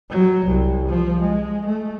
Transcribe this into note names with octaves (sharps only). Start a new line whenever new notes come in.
F#3
C2
F3
G#3
A3